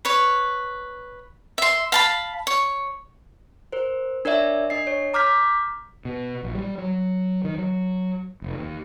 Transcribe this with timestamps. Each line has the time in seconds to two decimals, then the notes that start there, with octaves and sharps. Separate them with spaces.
0.05 B4 C#5
1.58 E5 C6
1.92 F5 A5 B5
2.47 C#5
3.72 A#4 C5
4.25 D4 A#4 C#5 D5 E5
4.70 D4 D#5 C7
4.87 C#5
5.14 A#5 D6 F6 G6 B6
6.05 B2
6.43 A#1
6.55 G3
6.78 F#3
7.44 D#3
7.58 F#3
8.42 F1
8.58 D#2